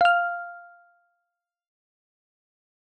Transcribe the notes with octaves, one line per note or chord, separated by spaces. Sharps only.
F5 F6